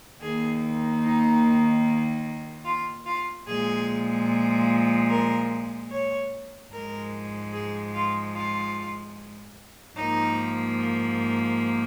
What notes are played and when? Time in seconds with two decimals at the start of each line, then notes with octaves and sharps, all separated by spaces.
0.21 D#2 D#3 A#3 G#4
1.03 D#4
2.65 F4
3.06 F4
3.46 A#2 F3 G#3 G#4
5.09 A#4
5.91 C#5
6.72 G#2 F3 G#3 A#4
7.53 G#4
7.94 F4
8.35 F4
9.96 G#2 F3 A#3 D#4